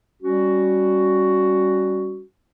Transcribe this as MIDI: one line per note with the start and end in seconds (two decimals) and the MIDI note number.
0.22 2.21 55
0.22 2.21 61
0.22 2.21 66